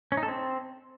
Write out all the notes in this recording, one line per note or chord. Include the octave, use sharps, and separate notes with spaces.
C#4
D#4
A4
C4